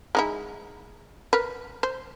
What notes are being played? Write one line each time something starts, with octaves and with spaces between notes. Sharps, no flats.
G#3 D#4 E4
A#4 B4
C5